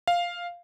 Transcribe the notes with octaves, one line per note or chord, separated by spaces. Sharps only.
F5